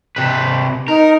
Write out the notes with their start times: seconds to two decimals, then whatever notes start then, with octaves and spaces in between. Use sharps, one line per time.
0.16 C3 B4
0.88 D#4 A#4